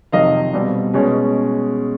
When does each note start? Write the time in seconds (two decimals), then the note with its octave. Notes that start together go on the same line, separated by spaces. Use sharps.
0.12 F2 C3 D#3 F#3 D#5 F5
0.54 B2 G3 C4
0.94 B2 G#3 C#4